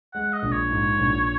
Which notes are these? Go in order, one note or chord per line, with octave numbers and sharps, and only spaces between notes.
G#3 F#5
D#5
A#1
C#5
G#2
A#1